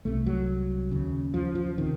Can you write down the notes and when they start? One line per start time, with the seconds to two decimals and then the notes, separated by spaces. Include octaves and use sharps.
0.05 C2 C3 A3
0.26 F#3
0.91 D#2 C#3
1.34 F3
1.55 F3
1.78 C3 D#3